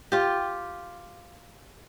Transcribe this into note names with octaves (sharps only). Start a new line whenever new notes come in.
F4 G4